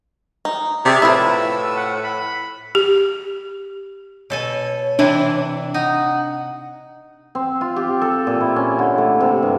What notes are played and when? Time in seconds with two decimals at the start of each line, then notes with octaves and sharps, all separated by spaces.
0.45 D#4
0.85 C3 G#4 D5 E5
1.02 A2 F3 E4 B4 E6
1.76 F#5
2.03 B5
2.75 G4
4.30 B2 A4 C#5 G#5
4.99 C3 E3 D4 E4
5.74 D#4 F#5
7.35 C4
7.61 F4
7.76 G4
8.01 A4
8.27 A#2
8.40 E4
8.56 C#4
8.79 D3
8.98 A3
9.20 C3
9.43 G2